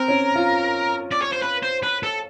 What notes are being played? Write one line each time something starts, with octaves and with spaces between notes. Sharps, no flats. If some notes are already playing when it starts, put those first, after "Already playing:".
Already playing: C4 A#4
C#4
F4
D5
C#5
C5
B4
C5
B4
A4